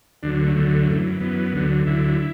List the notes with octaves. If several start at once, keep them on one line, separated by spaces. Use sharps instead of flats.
D2 D3 F#3 D4
A3
D2 D3 F#3
F#2 E3
F#2 E3 B3
D2 D3 F#3
D2 D3 F#3 E4